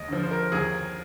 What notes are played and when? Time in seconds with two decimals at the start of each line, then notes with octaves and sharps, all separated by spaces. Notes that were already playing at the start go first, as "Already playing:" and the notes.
Already playing: D#2 D#5
0.08 D3 F3
0.23 C5
0.31 A#4
0.52 D#2 G#4